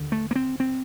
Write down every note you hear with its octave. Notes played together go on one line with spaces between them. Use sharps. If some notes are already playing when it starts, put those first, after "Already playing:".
Already playing: D#2 D3
A3
A#3
C4
C4